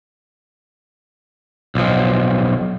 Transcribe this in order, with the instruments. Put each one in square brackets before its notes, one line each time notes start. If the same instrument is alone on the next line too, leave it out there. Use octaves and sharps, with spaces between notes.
[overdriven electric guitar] B1 F3